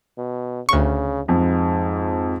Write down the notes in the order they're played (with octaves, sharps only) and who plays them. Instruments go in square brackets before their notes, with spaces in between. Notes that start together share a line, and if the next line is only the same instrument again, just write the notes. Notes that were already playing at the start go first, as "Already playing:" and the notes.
[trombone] B2
[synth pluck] D2 C#6 [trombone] C#3
[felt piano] F2 [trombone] G#2